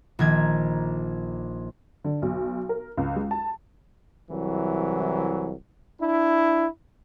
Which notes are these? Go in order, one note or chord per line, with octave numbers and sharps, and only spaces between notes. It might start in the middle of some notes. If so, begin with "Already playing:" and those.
A#1 D#3 G#6
D3
B1
A#4
C#2
G#3
A5
C2 E3 F#3
D4 E4